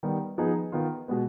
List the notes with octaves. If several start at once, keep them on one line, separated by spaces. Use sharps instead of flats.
D#3 G3 B3
F3 B3 D#4 G#4
D#3 B3 F4
B2 G#3 B3